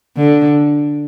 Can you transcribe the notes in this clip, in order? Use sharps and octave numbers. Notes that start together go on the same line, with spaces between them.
D3